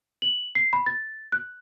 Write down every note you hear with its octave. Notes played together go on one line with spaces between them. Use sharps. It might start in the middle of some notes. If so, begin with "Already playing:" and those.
F#7
C7
B5
A6
F#6